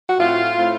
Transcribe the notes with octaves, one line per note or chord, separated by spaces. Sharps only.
F#4
A2 A3 C4 F4
A2 A3 C4